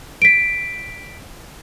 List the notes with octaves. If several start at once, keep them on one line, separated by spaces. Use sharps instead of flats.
B6 D7